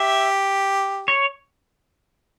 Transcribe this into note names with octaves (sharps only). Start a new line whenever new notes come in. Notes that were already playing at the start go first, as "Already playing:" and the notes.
Already playing: G4 E5
C#5